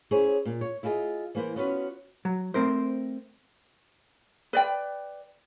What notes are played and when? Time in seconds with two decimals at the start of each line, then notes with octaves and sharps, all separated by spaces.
0.11 C#4 E4 G#4 C5 C#5
0.45 A#2
0.61 C#5
0.83 E4 F4 G#4 B4 D#5
1.35 E3 A#3 B4 C5
1.56 B3 C#4 F4 F#4 B4
2.25 F#3
2.54 A3 C4 A#4 C5
4.53 B4 D5 G5